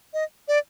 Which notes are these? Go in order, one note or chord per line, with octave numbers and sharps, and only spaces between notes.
D#5
D5